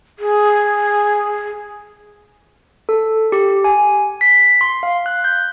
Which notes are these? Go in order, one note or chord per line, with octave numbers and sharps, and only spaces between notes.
G#4
A4
G4
G#5
B6
C6
F5
F#6
G6